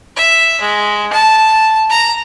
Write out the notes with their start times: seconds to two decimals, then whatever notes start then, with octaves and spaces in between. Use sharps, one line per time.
0.16 E5
0.61 G#3
1.12 A5
1.90 A#5